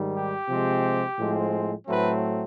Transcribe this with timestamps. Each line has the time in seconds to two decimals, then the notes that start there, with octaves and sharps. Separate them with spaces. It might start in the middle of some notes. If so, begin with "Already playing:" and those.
Already playing: G#2 D#3 G3
0.14 G4
0.49 C3 F3 G#3 C4
1.18 A2 F3 G#3 C4
1.88 A2 F#3 A3 C4 B4